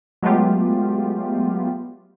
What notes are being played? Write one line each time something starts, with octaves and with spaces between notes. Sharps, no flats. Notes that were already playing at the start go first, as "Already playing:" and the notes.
F#3 G#3 A3 B3 F4 G4